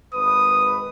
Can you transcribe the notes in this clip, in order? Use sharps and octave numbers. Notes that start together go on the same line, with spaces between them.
G#1 B4 D#6